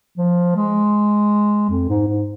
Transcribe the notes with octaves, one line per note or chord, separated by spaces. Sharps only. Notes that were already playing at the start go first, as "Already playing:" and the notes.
F3
G#3
F2
G#2
G#2